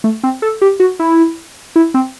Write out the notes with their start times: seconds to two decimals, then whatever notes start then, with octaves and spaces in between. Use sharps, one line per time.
0.04 A3
0.23 C4
0.42 A4
0.62 G4
0.80 F#4
0.99 E4
1.76 E4
1.94 C4